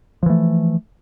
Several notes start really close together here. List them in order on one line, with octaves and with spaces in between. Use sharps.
F3 E3 A3